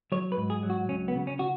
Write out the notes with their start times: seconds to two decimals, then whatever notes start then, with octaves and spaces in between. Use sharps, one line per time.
0.12 F#3 C#5
0.32 B4
0.37 G#2
0.50 G#4
0.63 F#3
0.70 F#4
0.88 C#2 C#4
1.08 B3
1.15 C#3
1.27 C#4
1.39 F#4